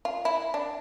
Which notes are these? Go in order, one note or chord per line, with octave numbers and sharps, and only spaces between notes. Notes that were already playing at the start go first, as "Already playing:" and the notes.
F4
E4
D4